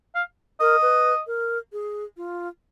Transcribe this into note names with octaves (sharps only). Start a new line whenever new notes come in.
F5
A#4 D#5
B4
A#4
G#4
F4